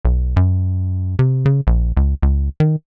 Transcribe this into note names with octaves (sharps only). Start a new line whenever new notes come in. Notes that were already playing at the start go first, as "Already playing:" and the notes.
B1
F#2
C3
C#3
A#1
C#2
C#2
D#3